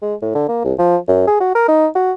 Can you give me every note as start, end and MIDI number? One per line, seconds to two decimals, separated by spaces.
0.02 0.15 56
0.22 0.34 45
0.35 0.47 50
0.49 0.64 58
0.64 0.74 36
0.79 0.97 53
1.08 1.24 42
1.27 1.38 68
1.40 1.54 66
1.55 1.63 70
1.68 1.87 63
1.95 2.12 66